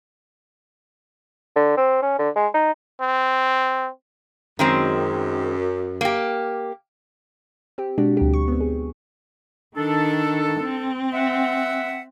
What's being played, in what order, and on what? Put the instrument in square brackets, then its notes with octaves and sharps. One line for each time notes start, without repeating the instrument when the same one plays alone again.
[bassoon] D3
C4
C#4
D3
G#3
D#4
[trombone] C4
[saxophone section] F#2 [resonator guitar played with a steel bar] D#3 G#3 C4
[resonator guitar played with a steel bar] A#3 G4
[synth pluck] C4 G4
B2 G#3 D4 F#4 G4
D2 F#3 G4
C#6
B3 C4
G#4
[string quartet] D#3 [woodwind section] D4 A4
[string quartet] C4
[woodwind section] E5 F#5